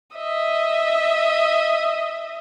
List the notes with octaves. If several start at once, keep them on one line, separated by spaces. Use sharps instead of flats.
D#5 E5